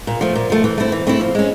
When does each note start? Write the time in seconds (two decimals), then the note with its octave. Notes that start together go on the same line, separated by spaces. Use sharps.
0.07 A#2
0.21 F3 A3
0.35 A#2
0.50 F3 A3
0.64 E3
0.78 A3 C4 E4
0.92 E3
1.07 A3 C4 E4
1.21 F3
1.35 G#3 C#4